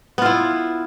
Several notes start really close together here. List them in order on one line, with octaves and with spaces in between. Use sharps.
B3 F4 E4